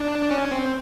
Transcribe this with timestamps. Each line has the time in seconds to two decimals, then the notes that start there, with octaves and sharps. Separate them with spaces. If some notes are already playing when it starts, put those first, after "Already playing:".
Already playing: D4
0.31 C#4
0.52 C4